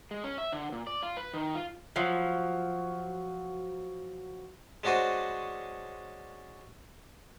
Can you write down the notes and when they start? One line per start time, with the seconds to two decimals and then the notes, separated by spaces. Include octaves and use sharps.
0.11 G#3
0.24 C#4
0.38 E5
0.52 D3
0.72 A#2
0.87 D5
1.03 F4
1.17 B4
1.33 D#3
1.55 F4
1.96 F3 F#3
4.84 G#3 C#4 D4 F#4 C5 D#5